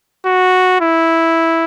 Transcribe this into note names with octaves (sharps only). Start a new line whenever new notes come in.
F#4
E4